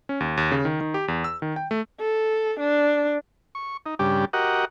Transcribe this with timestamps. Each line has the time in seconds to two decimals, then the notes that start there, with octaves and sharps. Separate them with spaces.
0.09 C#4
0.20 D#2
0.37 D#2
0.52 C#3
0.65 D#3
0.81 D#3
0.94 G4
1.08 E2
1.24 E6
1.42 D#3
1.56 G5
1.71 A3
2.01 A4
2.60 D4
3.55 C#6
3.86 D#4
3.99 G2 C#3 G3 D4 G4
4.33 F#4 G4 A#4 D#5 F#5